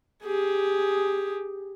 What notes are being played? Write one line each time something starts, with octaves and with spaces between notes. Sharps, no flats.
G4 G#4